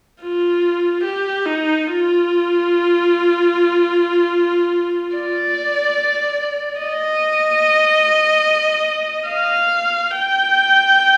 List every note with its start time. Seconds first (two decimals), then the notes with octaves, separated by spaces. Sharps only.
0.22 F4
1.04 G4
1.46 D#4
1.87 F4
5.16 D5
6.81 D#5
9.28 F5
10.11 G5